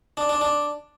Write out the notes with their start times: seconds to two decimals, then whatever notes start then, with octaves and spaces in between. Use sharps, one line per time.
0.17 D4
0.29 D4
0.41 D4